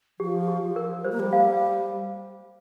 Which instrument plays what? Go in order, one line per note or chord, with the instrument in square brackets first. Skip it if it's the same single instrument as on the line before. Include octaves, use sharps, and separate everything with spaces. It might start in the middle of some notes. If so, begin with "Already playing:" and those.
[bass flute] F3 [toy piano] G4
[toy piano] G4
[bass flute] F3
[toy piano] A#4
[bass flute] G3 [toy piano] C5
[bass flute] A#3
G3
[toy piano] F5